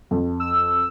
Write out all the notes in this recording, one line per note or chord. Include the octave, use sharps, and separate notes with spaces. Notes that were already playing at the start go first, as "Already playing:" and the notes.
F2
E6